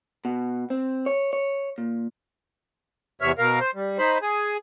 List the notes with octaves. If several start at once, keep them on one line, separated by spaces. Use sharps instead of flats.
B2
C4
C#5
C#5
A#2
E2 C3 C#5 E5 F6
B2 A#4 F5
C5
G3
D#4 C5 B5
G#4